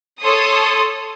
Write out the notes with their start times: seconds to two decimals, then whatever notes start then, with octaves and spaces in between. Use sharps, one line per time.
0.21 A4 C#5 C6 D#6